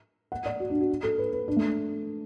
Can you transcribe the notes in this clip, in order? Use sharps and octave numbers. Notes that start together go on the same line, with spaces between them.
F#5
D5
F#4
D4
F#4
A4
B4
B4
D4
A3